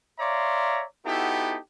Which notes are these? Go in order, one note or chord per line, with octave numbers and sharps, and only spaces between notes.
C#5 D5 E5 F5 A#5 C6
B3 D#4 E4 F#4 G4 A4